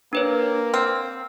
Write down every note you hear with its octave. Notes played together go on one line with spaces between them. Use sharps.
A#3 D4 B4 C#5
C4 F6